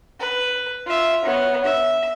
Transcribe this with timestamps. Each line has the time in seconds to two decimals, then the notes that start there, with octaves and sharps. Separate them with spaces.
0.20 B4
0.86 F4 E5
1.25 B3 C#5
1.63 E5